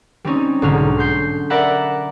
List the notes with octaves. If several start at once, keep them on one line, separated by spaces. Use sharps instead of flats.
G3 C4 C#4 D#4
B1 G#2 D3 C#4 F6
C6 G6 C7
A#4 D5 E5 F#5 B5